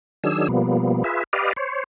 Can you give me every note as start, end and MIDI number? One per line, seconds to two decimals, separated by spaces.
0.24 0.48 51
0.24 0.48 54
0.24 0.48 62
0.24 0.48 68
0.24 0.48 88
0.48 1.04 47
0.48 1.04 53
0.48 1.04 55
0.48 1.04 58
0.48 1.04 59
1.04 1.24 65
1.04 1.24 68
1.04 1.24 71
1.04 1.24 76
1.33 1.53 67
1.33 1.53 71
1.33 1.53 74
1.33 1.53 75
1.33 1.53 77
1.56 1.84 72
1.56 1.84 73